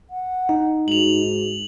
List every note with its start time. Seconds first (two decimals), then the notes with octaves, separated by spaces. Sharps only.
0.10 F#5
0.49 D#4
0.88 G#2 F#4 F7 F#7